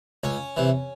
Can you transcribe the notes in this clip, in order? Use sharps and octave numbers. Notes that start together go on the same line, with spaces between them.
C#2 C#4
C3 E3